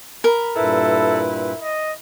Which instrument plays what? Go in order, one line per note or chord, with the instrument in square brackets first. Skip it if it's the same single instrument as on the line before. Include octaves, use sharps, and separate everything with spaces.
[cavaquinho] A#4 [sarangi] B5
[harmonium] G2 A#2 B4 [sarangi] E4 [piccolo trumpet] A4
[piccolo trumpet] D#5